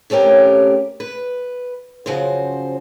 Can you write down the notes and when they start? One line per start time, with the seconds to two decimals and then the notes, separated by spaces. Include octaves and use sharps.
0.10 C3 A3 C#4 G4 A#4
1.00 B4
2.06 F#2 C#3 F3 F#4 C5